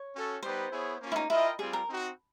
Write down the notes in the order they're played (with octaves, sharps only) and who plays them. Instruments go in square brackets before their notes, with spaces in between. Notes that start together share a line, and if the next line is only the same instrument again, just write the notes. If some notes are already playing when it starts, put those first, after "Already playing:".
Already playing: [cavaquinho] C#5
[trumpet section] C#4 F#4 A4
[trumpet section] G3 B3 D#4 G4 B4 [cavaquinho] C5
[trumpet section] B3 E4 G#4 C#5
A#3 C#4 F4
[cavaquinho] E4
D#4
[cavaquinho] E4 [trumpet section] F4 A#4 D#5 G5
[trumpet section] G3 C4 F4 [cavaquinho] G#4
[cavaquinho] A#4
[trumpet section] C4 D#4 F#4